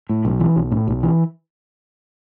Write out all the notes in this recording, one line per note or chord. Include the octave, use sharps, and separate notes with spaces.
A2
B1
E3
B1
A2
B1
E3